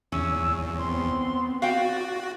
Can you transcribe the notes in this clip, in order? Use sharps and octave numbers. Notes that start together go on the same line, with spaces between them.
E2 C#4 E6
B3 C4 C6
F#4 D5 F5 G5